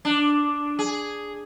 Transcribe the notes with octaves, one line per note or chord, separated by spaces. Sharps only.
D4
G#4